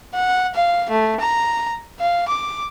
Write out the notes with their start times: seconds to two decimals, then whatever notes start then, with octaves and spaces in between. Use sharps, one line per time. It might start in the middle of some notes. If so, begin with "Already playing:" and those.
0.15 F#5
0.54 F5
0.90 A3
1.21 A#5
2.00 F5
2.29 D6